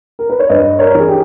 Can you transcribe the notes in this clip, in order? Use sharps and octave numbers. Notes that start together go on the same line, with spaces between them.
A#4
B4
C#5
G2 B4 D#5
A#4 C#5
E3
G#4
G4